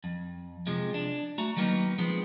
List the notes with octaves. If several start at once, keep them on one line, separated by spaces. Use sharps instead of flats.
F2
C3 F3 G#3
D4
A3 F#4 A#5
D#3 F#3 G3 A#3 B3 D#4
F3 G#3 B3 C4